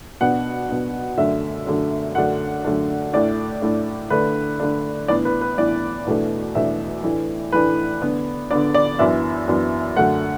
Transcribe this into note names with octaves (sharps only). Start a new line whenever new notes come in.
B2 B3 D4 F#5
B2 B3 D4
F#2 D3 A3 D4 E5
F#2 D3 A3 D4
F#2 D3 A3 D4 F#5
F#2 D3 A3 D4
A2 A3 D4 D5
A2 A3 D4
D3 A3 D4 B4
D3 A3 D4
A2 E3 B3 D4 D5
B4
B4
A2 E3 B3 D4 D5
E2 B2 A3 D4
E2 B2 A3 D4 E5
A2 E3 A3 D4
A2 E3 A3 D4 B4
D3 B3 D4
D3 B3 D4 D5
D5
F#2 E3 B3 D4 E5
F#2 E3 B3 D4
F#2 D3 A3 F#5